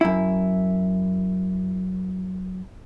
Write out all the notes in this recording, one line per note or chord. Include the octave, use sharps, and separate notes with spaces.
F#2 E4